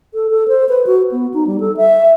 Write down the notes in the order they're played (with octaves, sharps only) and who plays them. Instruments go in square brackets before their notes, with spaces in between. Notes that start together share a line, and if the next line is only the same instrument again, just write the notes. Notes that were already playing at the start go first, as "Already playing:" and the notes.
[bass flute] A4
A4
C5
B4
F#4
B3
D#4
G3
A4
E5